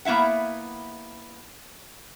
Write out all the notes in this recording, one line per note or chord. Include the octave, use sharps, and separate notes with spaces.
A#3 B3 E4 E5 F#5